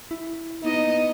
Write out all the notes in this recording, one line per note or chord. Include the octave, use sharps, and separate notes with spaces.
E4
B3 D#4 D#5